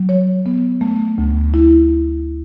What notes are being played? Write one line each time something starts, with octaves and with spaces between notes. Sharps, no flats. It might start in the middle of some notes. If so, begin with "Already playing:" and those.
Already playing: F#3
C#5
B3
A3
D2
E4